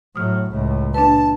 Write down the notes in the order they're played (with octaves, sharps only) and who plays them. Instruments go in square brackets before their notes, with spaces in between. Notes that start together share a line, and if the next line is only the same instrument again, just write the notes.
[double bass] A2 F#3 [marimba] D#6 F6
[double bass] C#2 A2
[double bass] A#2 [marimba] D4 B4 [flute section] A5